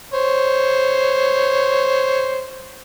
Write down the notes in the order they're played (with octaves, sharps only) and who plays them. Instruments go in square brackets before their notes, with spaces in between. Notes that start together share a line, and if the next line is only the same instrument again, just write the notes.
[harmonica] C5 C#5